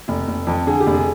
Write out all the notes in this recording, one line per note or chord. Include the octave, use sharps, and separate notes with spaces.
F1
F1
F2
D3 G#4
G4
F1
G#4